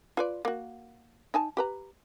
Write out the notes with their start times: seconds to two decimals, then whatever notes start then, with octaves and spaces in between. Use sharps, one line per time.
0.17 F4 B4 D5
0.45 A#3 F#4
1.34 D#4 G#5 A5
1.57 G4 B4 A#5